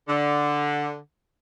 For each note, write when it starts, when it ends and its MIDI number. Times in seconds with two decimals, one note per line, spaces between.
0.08 0.98 50